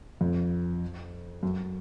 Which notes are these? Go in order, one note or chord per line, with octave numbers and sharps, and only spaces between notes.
F2
F#2